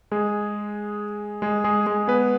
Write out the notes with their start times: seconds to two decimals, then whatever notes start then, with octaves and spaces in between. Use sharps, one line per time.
0.11 G#3 G#4
1.42 G#3 G#4
1.64 G#3 G#4
1.86 G#3 G#4
2.08 B3 B4